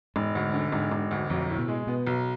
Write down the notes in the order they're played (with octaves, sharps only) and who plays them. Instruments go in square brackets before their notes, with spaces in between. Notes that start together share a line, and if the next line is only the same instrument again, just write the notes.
[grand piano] E1 [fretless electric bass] G#2
[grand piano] D2
D3
[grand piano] E1 [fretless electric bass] G#2
[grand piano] E1
D2
[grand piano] B1 [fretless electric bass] F2
[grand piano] A2
[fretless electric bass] B2
[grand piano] G#3
[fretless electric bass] B2 [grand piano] B3
[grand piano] B1